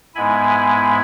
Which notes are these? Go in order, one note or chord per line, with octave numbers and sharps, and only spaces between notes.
G#2 G#3 B3 E4 G#5 B5